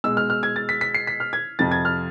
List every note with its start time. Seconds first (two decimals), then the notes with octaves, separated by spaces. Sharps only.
0.04 B2 G#3 E6
0.17 F6
0.30 F6
0.43 G#6
0.56 A6
0.69 B6
0.81 B6
0.95 C7
1.07 B6
1.20 F6
1.33 G#6
1.59 F2 C3 F3 A6
1.71 G#6
1.85 F6